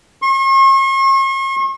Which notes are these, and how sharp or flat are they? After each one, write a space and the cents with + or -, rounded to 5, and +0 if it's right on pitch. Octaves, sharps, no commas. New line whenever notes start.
C#6 -45